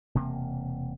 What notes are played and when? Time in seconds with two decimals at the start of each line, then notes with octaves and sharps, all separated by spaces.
0.15 E1 C3 A#3